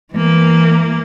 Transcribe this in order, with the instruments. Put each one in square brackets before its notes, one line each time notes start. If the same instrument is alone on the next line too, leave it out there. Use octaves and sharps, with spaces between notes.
[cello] E3 A#3